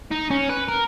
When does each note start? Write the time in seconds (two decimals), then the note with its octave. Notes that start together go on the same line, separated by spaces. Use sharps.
0.12 D#4
0.31 C#4
0.49 B4
0.69 A#4